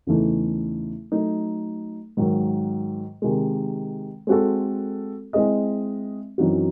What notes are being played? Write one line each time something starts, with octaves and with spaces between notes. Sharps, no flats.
E2 C#3 E3 A3 D#4
F#3 A3 D#4
G#2 D#3 F#3
C3 D#3 G#3
G#3 C4 F#4 A4
G#3 C4 E4 G#4 D#5
F#2 E3 C4 D#4 F#4